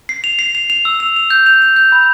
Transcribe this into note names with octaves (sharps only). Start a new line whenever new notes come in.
C7
F7
C7
F7
F7
E6
F7
F7
G6
F7
F7
G6
B5